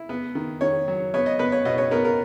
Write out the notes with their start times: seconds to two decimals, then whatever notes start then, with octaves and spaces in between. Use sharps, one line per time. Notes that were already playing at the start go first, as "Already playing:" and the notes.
Already playing: E4
0.09 B3
0.35 D#3
0.61 D#3 C#5
0.88 F#3
1.14 B3 C#5
1.26 D#5
1.39 B3 B4
1.52 C#5
1.65 B2 D#5
1.78 C#5
1.91 B3 A#4
2.05 A#4